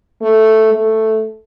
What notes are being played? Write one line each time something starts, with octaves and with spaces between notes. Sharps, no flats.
A3
A3